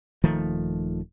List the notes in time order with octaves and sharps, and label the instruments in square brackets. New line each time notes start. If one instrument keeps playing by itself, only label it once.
[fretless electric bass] D#1 D#3 F3 A3